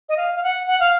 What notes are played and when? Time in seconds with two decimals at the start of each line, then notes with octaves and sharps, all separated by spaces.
0.09 D#5
0.17 F5
0.35 F5
0.43 F#5
0.67 F#5
0.80 F5